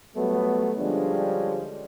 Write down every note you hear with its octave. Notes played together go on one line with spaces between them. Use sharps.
F#3 G3 A3 B3
D3 F3 G3 G#3 C#4 D4